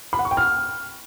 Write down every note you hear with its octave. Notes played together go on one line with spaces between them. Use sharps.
B5
F#5
C#6
G5
F6